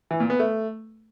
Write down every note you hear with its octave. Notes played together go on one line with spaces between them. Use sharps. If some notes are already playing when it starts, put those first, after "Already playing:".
E3
A#2
B3
A3